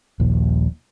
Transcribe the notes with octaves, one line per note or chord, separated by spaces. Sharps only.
D#1 A#1 D#2